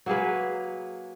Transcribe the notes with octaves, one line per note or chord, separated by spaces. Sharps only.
F#3 A#3 G#4 B4